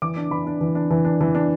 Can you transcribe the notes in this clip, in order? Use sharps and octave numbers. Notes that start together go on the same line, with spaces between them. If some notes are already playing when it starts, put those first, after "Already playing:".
E3 D6
D4
E3 B5
D4
E3
D4
E3
D4
E3
D4